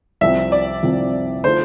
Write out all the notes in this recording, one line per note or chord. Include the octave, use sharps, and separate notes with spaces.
C2 C3 F3 C4 E5
D5
C2 C3 F3 C4
D3 A3 D4 F4 C5